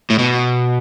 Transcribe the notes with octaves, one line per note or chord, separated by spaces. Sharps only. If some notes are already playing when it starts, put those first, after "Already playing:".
A2
B2